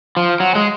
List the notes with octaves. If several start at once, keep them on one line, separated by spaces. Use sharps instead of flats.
F3
F#3
G#3